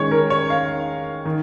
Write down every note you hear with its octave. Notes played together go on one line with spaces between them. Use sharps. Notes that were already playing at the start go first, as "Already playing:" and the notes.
Already playing: D#3 G#3 C#4 C#5
A#4
C#5
F5
D#3